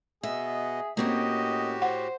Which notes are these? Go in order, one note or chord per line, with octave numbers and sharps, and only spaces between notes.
B2 B3 G#4 D#5 E5
A2 A#3 C4 C#4 F#4 G4 D#5
C5 F#5